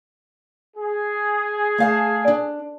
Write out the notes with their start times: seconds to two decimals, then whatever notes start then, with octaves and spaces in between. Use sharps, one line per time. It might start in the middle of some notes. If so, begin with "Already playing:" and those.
0.77 G#4
1.78 A3 F5 A5
2.28 D4